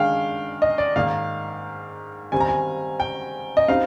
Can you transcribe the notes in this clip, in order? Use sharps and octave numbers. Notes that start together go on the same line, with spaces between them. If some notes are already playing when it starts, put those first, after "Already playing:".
Already playing: D#3 G#3 D4 F5 G5
D#5
D5
G#2 D#3 A#3 F5
D#3 G3 C4 G#5
A#5
G#5
G5
D#5
G3 C4 D#4 F5